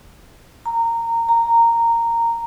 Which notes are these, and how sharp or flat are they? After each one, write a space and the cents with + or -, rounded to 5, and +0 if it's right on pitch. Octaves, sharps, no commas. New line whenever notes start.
A#5 -15
A#5 -10